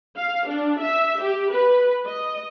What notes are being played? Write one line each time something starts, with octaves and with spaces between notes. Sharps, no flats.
F5
D4
E5
G4
B4
D#5